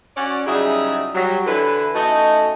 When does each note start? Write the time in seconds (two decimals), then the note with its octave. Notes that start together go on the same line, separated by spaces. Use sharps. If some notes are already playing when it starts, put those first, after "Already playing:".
0.16 C#4 F#4 D5
0.47 C#3 F#3 G3 D#4 E4 G#4
1.14 F#3 G3
1.46 D3 E3 E4 B4
1.95 A3 C#4 D#4 E4 F#4 D#5